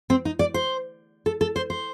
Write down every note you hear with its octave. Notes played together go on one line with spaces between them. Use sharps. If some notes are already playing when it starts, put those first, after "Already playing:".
C4
D#4
D5
C5
A4
A4
C5
C5